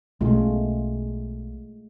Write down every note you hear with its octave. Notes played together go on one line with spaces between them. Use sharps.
B1 B2 G#3 A3 C#4 F4